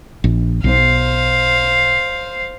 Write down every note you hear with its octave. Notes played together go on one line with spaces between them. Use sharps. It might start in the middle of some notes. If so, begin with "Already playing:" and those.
A#1
B1 C5 F5